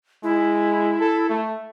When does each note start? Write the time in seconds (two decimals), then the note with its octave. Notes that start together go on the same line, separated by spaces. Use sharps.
0.23 G#3 E4
1.00 A4
1.29 A3